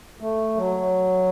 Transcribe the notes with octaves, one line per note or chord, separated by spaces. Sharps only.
A3
F#3